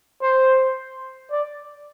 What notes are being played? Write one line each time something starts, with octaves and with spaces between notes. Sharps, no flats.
C5
D5